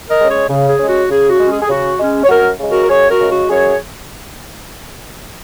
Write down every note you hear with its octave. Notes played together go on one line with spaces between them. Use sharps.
A#4 D#5
G#3 C#4
G#4 C#5
C#3
G#4
G#3 C#4
F#4
C#3 G#4
F#4
G#3 C#4
G#4
G#4
C#3 F#4
G#3 C#4
C#5
F#2 F#4 A#4
C#3 G#3
F#4 A#4
A#4
F#2 G#4 C#5
F#4 A#4
C#3 G#3
F#4
F#2 G#4 C#5